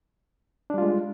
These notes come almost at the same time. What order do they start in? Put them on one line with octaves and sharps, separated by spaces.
D4 G3 F4 G#3